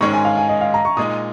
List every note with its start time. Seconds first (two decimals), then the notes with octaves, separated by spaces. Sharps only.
0.01 G#2 D#3 G#3 C#4 C#6
0.13 G#5
0.25 F5
0.37 G#5
0.49 D#5
0.61 F5
0.74 A#5
0.85 C#6
0.97 A#2 G#3 D#4 D#6